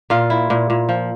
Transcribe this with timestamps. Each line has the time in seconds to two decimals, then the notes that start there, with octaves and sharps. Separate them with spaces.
0.10 A#2 F4
0.30 E4
0.50 A#2
0.70 A#2
0.89 F3